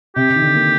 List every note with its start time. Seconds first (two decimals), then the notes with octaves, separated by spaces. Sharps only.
0.16 C3 G4
0.29 C3
0.36 D#3
0.42 D3
0.55 A#3